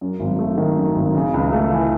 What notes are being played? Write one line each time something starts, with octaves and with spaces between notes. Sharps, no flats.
F#2
G#1
A3
D#3
F#2
G#1
C#3
C#2
A3
E3